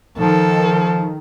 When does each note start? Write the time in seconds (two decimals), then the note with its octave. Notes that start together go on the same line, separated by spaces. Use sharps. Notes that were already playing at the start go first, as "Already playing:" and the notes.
0.19 D#3 F3 A4